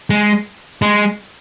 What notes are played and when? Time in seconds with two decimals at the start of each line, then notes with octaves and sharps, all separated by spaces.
0.10 G#3
0.82 G#3